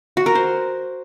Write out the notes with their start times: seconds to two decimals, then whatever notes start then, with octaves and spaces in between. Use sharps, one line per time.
0.17 F#4
0.26 A#4
0.35 C5